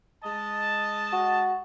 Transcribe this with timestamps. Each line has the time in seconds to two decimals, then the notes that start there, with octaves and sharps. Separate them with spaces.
0.24 G#3 D#5 A5
1.12 F#4